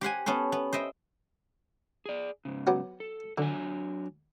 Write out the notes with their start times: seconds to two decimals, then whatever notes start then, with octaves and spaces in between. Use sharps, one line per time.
0.01 G4 C5 F#5 G#5
0.26 B3 C#4 A4 C5
0.52 B3
0.73 C5 D#5 E5 G5
2.06 G#4 D5
2.45 G#2 C#3
2.67 F#3 B3 G4
3.00 A4
3.38 D3 F#3 D4 G#5